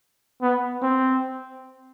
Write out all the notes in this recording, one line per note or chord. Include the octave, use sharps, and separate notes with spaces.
B3
C4